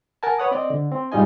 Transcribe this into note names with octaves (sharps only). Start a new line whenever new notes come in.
A#4 F#5 G#5 A5
B4 C#5 F#5 D#6
C4 D5 D#5
D3
C4
G#2 G3 D#4 F4 D#5 G#5